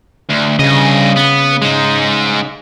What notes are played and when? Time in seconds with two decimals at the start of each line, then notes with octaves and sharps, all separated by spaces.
0.29 D2
0.59 G2 C#3 D#5
1.16 B3
1.62 G#3 D#4